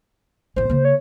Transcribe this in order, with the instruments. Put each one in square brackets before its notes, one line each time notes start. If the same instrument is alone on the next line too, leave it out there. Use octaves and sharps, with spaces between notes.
[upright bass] A1 E3 [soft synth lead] C5
[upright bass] C#3 A#3
[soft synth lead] C#5